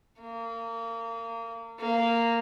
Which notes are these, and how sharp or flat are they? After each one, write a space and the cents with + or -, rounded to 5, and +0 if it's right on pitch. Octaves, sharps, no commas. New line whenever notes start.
A#3 -30
A#3 -10